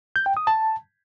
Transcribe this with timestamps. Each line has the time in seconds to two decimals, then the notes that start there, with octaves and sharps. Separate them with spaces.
0.16 G6
0.26 G5
0.37 D#6
0.47 A5